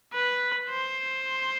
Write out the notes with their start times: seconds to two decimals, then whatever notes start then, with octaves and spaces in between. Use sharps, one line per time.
0.13 B4
0.69 C5